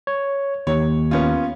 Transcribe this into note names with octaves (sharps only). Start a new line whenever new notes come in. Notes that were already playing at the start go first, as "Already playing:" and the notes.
C#5
D#2 C#5
B3 C#4 F4